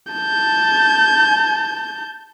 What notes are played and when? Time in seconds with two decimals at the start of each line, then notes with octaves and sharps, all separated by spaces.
0.12 A5 G6